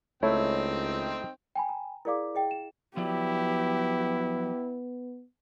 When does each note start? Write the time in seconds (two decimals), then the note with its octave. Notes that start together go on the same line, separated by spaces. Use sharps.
0.23 C#2 A3 C4 D#4 E4 C#5 G5
1.55 G5 G#5 B5
1.69 A#5
2.05 E4 G#4 A#4 D5 F5 D6
2.35 G#4 D#5 G5
2.51 E7
2.97 F3 F#3 B3 E4 G4 D5